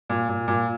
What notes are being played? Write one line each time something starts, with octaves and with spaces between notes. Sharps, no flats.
A#2
A#2
A#2